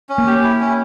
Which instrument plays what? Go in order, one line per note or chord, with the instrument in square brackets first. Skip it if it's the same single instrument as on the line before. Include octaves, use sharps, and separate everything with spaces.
[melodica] C#4
[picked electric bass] A#3
[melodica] G4
E4
C#4